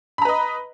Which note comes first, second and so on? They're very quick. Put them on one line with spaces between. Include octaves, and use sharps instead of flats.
B5 A#5 B4 D#5